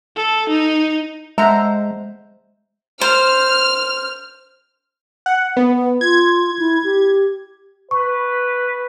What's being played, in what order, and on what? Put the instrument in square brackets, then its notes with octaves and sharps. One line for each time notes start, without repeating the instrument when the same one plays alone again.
[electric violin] A4
D#4
[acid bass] G#3 [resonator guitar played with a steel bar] C5 A#5 [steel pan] E5 F#5
[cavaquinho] C5 [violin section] F6
[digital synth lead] F#5
B3
[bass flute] F4 [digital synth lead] G#6
[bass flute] E4
G4
[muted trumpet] B4 [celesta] C#6